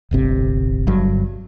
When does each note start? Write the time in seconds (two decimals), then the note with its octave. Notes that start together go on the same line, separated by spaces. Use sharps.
0.11 D1 G1 C3
0.87 G1 G2 F#3